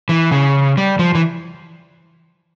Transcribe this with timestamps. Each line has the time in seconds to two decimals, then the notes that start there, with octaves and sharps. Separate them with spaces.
0.09 E3
0.31 C#3
0.77 G3
0.99 F3
1.15 E3